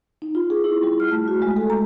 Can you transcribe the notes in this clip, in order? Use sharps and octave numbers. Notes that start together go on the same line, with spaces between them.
D#4
F4
G#4
E4
G3
F6
A3
F#4
G#3
A4
A#5